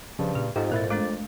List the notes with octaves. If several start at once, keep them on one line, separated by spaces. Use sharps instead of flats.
G2 C#3 F3
A#2 G#4
F2 G#2 D#4 F4 G4 A4
A#2 E4 A#4 A6
G#3 A3 D4 D6 A6